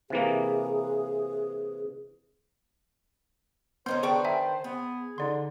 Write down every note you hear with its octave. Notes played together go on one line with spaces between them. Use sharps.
C3 E3 A#3 G#4
B3 C#4 D#4 A#4 C5 C6 G6
D#3 D4 G#4 B4 A5 C#6
E5 G#5 A#5
B3 G#4
D3 D#4 D5 C6